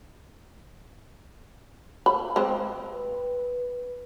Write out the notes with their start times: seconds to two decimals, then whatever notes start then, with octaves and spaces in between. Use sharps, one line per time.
2.06 B5
2.36 G#3 C4
2.93 B4